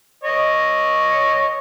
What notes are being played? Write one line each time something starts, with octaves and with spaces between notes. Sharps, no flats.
C#5 D#5